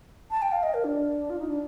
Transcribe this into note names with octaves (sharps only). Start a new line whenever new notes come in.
A5
G5
F5
D#5
A#4
D4
F4
D#4
D4